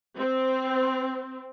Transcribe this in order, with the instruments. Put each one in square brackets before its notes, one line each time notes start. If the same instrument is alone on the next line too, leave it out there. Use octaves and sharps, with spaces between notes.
[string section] C4